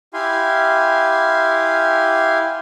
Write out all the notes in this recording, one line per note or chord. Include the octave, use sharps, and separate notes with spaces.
E4 G4 F5 G#5 C6